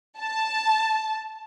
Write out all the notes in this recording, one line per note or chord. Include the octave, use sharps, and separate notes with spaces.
A5